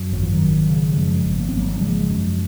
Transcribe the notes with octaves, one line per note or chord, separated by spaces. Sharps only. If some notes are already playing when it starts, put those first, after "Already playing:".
Already playing: F#2
G#1 F#3
F3
D#3 F#3
G#1
C#3
F#3
F#2 F3 G#3
G#1
A#3
C4
G#1 F#3 A#3
F#3
C#3 F3 G#3
F#2